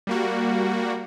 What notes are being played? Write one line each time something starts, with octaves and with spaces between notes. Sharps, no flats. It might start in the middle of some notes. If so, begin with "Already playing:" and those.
G3 A#3 F#4